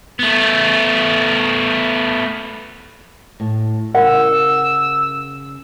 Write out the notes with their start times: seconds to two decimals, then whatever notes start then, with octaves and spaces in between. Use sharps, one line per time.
0.19 A3 B3
3.40 A2
3.95 C#3 A#4 F#5 E6